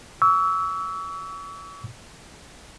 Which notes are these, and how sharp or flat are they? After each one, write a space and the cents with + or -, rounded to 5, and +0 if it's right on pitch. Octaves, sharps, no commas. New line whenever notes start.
C#6 +40 E6 -10